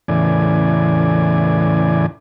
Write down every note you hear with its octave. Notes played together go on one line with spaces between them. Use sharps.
E2 A2 C#3 E3 D5 G#5